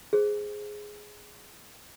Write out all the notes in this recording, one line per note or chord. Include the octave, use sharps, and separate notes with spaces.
G#4 C5